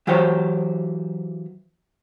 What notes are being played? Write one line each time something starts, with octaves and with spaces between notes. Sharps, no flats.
E3 F#3 F4 G4 C5 C#5